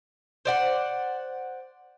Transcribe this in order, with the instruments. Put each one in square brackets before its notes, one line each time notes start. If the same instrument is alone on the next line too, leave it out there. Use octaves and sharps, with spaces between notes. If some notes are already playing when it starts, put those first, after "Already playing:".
[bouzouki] C5 D5 F#5